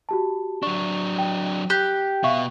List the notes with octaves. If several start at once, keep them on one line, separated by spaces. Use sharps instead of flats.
F#4 G4 A5
F#3 D4 C#6
G5
G4 F#6
B2 E5 F5 C#6